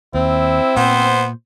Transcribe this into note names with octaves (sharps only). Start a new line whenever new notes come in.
D#2 C4 E4
A#2 B3 C5